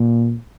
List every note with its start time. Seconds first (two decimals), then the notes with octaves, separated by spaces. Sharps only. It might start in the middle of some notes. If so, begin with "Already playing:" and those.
Already playing: A#2